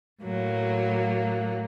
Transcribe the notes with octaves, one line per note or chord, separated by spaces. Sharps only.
A2 F#3 A#3